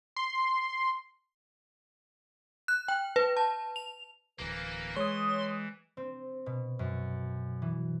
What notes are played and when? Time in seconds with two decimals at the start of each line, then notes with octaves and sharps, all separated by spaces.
0.16 C6
2.68 F#6
2.88 G5
3.16 B4
3.37 A5
3.76 F7
4.39 D1 E3 A#3
4.96 G#3 C#5 C6 D#6
5.97 C4
6.46 B2
6.79 F#2
7.62 E3